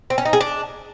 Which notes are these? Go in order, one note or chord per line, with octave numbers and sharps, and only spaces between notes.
C4
C#4
D#4
G#4
D4